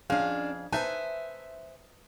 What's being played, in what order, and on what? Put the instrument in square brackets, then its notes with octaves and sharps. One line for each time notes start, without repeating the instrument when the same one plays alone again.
[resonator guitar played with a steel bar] F2 G#4 F5 [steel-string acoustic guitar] C#4 D4
[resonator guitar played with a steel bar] D#4 B4 A5 [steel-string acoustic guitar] C5 E5 G#5